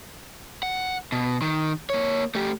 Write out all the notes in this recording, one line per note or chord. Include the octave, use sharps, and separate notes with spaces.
F#5
B2
D#3
A#3 C#5
A3 G4